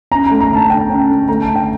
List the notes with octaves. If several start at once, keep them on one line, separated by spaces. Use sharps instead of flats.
C#4 A#5
A3 A#5
A#5
D3 A5
D3 G5
C#4
A3
A3 A#5
A5
D3
G5